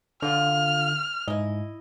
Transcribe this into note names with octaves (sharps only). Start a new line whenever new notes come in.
D3 F4 F5 F6
G#2 E4 D#5